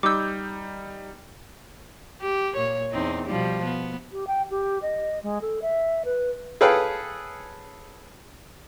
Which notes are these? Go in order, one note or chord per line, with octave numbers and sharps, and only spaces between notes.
G3 D#4 D6 E6 G6
G4
A#2 C#5
E2 C4 D#4
B2 F3 G3
B3
G4
G5
G4
D#5
G#3
A4
E5
B4
G#4 A4 B4 C#5 F5 G5